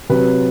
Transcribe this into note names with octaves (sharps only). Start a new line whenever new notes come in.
C3 F#3 B4